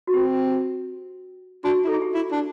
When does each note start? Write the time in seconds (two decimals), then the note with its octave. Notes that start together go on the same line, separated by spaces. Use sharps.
0.07 F#4
0.14 C4 G4
1.64 D4 F#4
1.84 E4
1.87 D#4 A4
1.94 G#4
2.02 G4
2.14 E4
2.32 D4